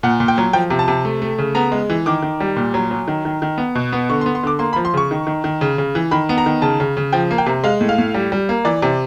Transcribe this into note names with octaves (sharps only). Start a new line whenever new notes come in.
A#2 F#5
A#2
G5
F#3
F3 G5
C3
A5
C3
A3
A3
C#3
B3 A#5
G#3
E3
D#3 D6
D#3
G3
A#2
F#3
F#3
D#3
D#3
D#3
B3
B2
B3
D3 C#6
C6
B3
C6
D3 D6
A#3 C6
B5
F3
C6
C#3 C#6
D#3
D#3
D#3
C#3
C#3
E3
D#3 B5
B3
A#5
D#3
C#3 A5
C#3
C#3
F3 G5
A#3
G5
C3
G#3 F5
A2
F5
A2
G3
G3
A#3
E3 D5
C3